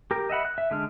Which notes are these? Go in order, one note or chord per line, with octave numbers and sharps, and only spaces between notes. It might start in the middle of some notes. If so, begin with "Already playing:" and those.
G4 A#4
D#5 E5 F#5 B5
F#6
E5
D3 G#3 D4 F6